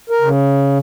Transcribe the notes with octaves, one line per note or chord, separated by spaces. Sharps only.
A#4
C#3